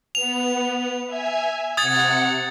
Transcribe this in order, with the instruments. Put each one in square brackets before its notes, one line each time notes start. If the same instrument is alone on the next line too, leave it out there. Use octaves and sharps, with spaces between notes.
[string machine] B3 [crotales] F7
[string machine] E5 G#5
[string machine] C3 F#5 C#7 [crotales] D#6 G#6 A6